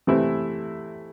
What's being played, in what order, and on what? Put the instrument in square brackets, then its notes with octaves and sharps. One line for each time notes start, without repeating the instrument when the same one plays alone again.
[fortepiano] C3 E3 A3 C4 E4